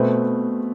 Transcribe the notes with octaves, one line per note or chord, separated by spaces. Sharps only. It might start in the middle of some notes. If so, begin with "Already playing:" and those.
Already playing: B2 A3 C4 B4